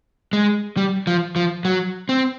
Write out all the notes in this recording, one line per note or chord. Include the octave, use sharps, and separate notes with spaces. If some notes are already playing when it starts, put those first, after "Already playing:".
G#3
G3
F3
F3
F#3
C4